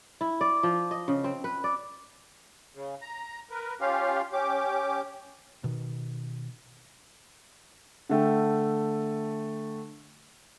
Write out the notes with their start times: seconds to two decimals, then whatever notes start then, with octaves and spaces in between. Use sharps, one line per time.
0.21 E4
0.41 D5
0.63 F3
0.91 D#5
1.08 C#3
1.24 C4
1.44 B4
1.64 D5
2.75 C#3
3.01 A#5
3.50 A#4 B4
3.81 C#4 F4 G4 F5
4.33 C#4 G4 D6
5.64 B2 D#3
8.09 D3 A3 G5